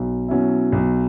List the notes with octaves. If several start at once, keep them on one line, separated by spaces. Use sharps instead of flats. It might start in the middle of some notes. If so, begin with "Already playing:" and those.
Already playing: B1
B2 F#3 C#4 E4
B1